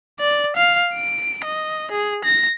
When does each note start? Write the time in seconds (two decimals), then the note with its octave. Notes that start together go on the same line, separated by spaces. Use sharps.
0.20 D5
0.56 F5
0.94 D7
1.44 D#5
1.91 G#4
2.24 A#6